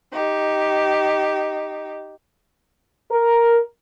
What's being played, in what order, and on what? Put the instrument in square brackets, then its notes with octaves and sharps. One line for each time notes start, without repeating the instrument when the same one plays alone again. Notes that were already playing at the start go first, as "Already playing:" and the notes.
[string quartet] D#4 G4
[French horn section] A#4